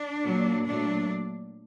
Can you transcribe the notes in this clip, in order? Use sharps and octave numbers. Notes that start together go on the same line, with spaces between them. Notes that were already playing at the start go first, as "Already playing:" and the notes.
Already playing: D4
A#2 F#3 A#3
A#2 F#3 A3 D4